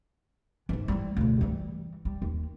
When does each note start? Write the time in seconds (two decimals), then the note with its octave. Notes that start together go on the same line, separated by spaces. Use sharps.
0.69 G#2 E3
0.88 G3 E4
1.17 D2 B2
1.41 E3 G3
2.05 G3
2.22 D#2